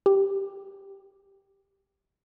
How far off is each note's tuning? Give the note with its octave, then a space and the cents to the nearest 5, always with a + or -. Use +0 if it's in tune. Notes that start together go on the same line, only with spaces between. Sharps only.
G4 +0